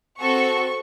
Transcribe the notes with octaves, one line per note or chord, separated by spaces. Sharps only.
C4 F#4 A4 C#6